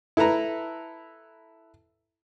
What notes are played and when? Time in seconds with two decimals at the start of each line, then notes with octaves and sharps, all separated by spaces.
0.17 E4 A4 B4 A#5